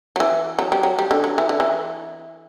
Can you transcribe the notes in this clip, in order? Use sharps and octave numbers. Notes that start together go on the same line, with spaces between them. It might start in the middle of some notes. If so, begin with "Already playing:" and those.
F#3
E3
F#3
G3
F#3
G3
D3
F#3
E3
D3
E3